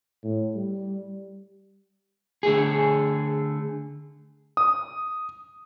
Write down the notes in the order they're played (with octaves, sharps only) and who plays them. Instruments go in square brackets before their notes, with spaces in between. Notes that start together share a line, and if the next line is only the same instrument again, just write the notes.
[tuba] A2
G3
[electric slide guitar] D3 A3 G#4
[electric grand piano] D#6